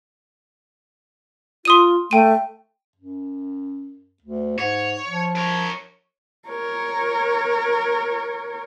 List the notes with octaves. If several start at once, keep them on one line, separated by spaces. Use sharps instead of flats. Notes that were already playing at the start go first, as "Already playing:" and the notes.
F4 C6 D#6 D#7
A3 G5 D#7
F#2
D2
G#2 C#5
F3
A#4 C#5
A#4 C#5